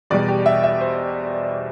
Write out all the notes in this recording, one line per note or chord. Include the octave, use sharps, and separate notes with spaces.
E2 B2 G3 D5
G4
E5
E5
C5